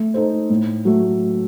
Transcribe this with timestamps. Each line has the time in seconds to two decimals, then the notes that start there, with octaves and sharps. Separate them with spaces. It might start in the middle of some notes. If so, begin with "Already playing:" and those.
Already playing: A3
0.14 D#4 A4 C5
0.50 A2
0.85 F#3 A3